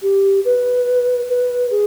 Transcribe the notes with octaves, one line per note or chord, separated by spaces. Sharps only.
G4
B4
B4
G#4